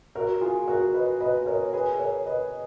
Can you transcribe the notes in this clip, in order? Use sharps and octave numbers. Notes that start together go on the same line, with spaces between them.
F#4 A#4
F4 G#4
F#4 A#4
B4 D#5
B4 D#5
A#4 C#5
G#4 B4
A#4 C#5
B4 D#5